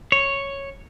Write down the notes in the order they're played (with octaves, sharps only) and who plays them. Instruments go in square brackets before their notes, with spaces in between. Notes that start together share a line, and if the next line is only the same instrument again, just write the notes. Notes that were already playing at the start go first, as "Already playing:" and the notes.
[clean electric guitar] C#5